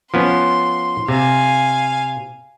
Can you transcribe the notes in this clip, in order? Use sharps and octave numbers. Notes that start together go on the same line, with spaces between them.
F3 B3 C#4 C6
C3 F5 G#5